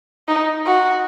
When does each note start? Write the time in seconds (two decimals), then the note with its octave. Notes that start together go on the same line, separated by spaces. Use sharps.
0.28 D#4
0.66 F#4